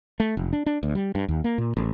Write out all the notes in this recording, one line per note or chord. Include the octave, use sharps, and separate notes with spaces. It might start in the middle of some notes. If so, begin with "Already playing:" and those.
A3
F1
D4
D4
D2
G3
G2
D#2
A#3
A#2
A1